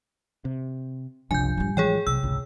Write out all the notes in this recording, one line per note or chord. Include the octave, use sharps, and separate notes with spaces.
C3
F#1 C2 F3 D4 G#5 G6
A1 G3
E3 F3 G#3 G#4 C#5 G5
B1 C3 E6
G#1 C#2